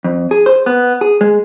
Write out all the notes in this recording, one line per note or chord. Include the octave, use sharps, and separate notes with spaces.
F2
G#4
C5
B3
G#4
G#3